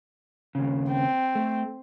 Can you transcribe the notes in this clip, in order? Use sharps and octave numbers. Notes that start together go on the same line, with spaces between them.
D#2 C#3
C4
A3